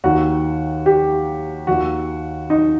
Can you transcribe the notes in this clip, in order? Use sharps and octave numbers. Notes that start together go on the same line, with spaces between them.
D#2 D#3 F#4
G4
D#2 D#3 F#4
D#4